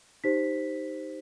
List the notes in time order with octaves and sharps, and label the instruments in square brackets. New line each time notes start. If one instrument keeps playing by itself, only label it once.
[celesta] D#4 G4 C5 B6